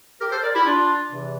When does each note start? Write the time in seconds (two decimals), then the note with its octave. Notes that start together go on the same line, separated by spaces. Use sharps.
0.20 G4 A#4
0.31 A4 C5
0.43 A#4 D5
0.54 E4 G4
0.65 D4 F4
1.10 E2 C3 E3